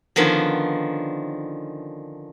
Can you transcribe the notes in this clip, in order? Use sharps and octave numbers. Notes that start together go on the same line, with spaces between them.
D3 D#3 F3 B3 C#4